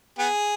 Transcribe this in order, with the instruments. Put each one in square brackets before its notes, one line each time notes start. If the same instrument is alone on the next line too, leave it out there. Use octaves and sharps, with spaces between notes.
[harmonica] B3 G#4